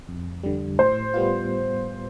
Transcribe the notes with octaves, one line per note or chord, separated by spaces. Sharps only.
F2
D3 G3
A2 C5
G3 B3 F4